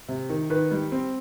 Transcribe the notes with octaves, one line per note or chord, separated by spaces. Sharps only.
C3
D#3
D#3 B4
G3
C4